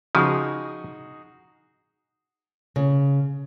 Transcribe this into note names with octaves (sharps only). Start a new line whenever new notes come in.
C#3 F3 D#4 F#4 G#4
C#3